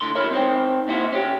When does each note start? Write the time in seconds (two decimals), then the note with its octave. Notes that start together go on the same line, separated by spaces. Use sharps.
0.01 A2 D3 C6
0.15 E4 A#4 C#5 E5
0.31 C4 D#4 C5 G5
0.88 A#2 E4 F#4 C5
1.12 C#4 G4